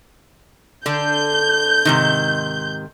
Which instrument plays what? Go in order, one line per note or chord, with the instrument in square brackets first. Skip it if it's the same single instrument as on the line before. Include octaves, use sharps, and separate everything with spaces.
[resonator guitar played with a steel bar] D3 D4 [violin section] G6
[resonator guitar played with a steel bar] G#2 C3 D#3